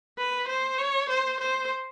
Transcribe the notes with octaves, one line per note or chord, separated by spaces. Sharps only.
B4
C5
C#5
C5
C5